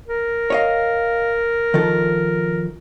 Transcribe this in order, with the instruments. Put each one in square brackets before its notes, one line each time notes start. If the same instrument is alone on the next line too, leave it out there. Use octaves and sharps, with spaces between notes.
[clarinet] A#4
[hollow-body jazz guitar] C#5 D#5 F5
D#3 F3 A4